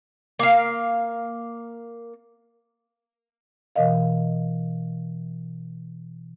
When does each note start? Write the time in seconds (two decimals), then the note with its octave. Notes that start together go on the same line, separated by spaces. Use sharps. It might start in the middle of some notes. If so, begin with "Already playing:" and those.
0.39 A#3 F5
3.76 B2 E3 A#4 D#5 F5